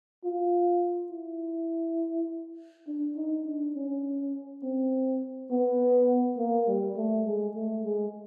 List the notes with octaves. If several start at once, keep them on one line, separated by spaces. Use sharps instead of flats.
F4
E4
D4
D#4
D4
C#4
C4
B3
A#3
G3
A3
G#3
A3
G#3